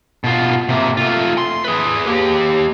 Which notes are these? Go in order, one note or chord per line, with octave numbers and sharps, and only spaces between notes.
B2 F4
C3 A#3
A3 F4
C6
G#4 B4
A#3 G4